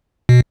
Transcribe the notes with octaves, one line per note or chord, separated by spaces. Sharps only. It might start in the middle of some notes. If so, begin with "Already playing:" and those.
B2